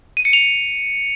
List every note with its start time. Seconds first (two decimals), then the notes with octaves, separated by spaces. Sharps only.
0.17 D#7
0.25 C#7
0.33 F7